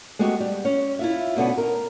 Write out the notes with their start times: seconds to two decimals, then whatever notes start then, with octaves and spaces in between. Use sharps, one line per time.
0.19 G#3 A3 B3 F#4 G4 D#5
0.40 G3
0.65 C#4
0.99 E4 F4 E5
1.36 B2 D3 B3 C#4
1.58 A#4